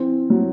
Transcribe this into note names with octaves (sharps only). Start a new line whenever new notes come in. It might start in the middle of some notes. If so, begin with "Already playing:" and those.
Already playing: E3 C4
F#3